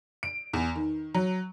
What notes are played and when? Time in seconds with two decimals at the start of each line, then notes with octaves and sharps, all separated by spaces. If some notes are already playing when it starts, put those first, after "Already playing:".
0.23 D7
0.53 E2
0.76 D#3
1.14 F#3